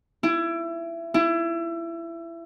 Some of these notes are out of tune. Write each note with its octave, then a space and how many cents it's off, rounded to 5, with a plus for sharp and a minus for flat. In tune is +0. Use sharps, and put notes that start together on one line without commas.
E4 +25
E4 +25